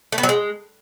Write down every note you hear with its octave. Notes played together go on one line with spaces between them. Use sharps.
A3
B3
F#3
G#3